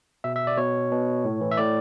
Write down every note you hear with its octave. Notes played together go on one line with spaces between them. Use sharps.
B2 E5
E5
D5
B2 C#5
B2
A2
E3
E5
A2 D5